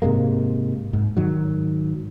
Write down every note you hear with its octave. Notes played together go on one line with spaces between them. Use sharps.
G#2 C3 G#3 A#3
G#2
G#2 D#3 F#3